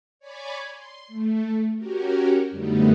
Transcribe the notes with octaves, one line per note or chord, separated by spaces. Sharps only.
C#5 D5 G#5 B5 D6
C6
A3
C#4 F#4 G4 A#4
F#2 D3 G3 A3 B3 D#4